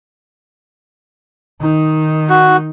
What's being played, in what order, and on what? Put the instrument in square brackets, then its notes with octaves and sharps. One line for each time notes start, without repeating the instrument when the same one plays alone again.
[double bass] D#3 D#4
[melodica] F#4